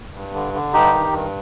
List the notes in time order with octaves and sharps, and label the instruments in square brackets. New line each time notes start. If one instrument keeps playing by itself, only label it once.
[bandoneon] G2
D3
D3
G2 D#4 G4
D#3
G2